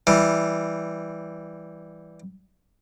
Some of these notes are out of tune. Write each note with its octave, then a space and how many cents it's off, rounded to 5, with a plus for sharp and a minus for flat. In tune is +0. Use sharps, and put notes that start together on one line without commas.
E3 +0 G3 +0